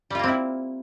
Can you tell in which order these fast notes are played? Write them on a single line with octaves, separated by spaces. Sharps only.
G3 F4 A#3 C4 E4